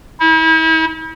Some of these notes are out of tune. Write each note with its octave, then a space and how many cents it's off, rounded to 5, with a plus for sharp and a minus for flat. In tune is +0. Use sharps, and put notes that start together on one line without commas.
E4 -40